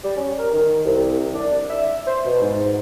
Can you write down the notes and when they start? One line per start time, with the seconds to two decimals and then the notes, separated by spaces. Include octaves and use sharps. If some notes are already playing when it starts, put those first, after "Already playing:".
0.04 G3
0.16 C#4
0.39 A#4
0.53 D#3
0.85 C2
1.35 D4
1.69 E5
2.07 C5
2.25 B2
2.41 G#2